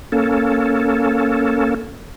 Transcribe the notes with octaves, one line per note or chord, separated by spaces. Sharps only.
A#3 C#4 A4